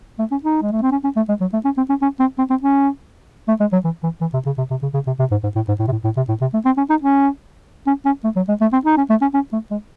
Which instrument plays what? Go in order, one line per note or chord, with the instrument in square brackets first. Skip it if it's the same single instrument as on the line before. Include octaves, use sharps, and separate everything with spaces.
[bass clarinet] A3
C#4
D#4
G#3
A3
C4
C#4
C#4
A3
G#3
F#3
A3
C#4
C4
C#4
C#4
C4
C4
C4
C#4
A3
G#3
F#3
E3
E3
E3
C3
C#3
C3
C3
C#3
C#3
C3
C3
G#2
G#2
A2
G#2
A2
C3
A2
A2
C3
A2
C3
A3
C4
C#4
D#4
C#4
C#4
C#4
A3
F#3
G#3
A3
C4
D#4
C#4
A3
C#4
C#4
A3
G#3